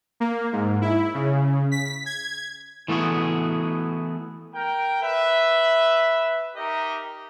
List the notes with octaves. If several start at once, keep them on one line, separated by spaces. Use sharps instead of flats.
A#3
G#2
E4
C#3
B6
G#6
E3 A3 B3 F#4 G#4
A#4 G5
B4 E5
D#4 G4 A#4 D#5 E5